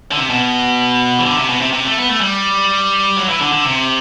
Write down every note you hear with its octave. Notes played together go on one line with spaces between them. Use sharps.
D3
C3
B2
E3
D3
C3
B2
C3
C3
A3
B3
A3
G3
F#3
E3
D3
D3
C3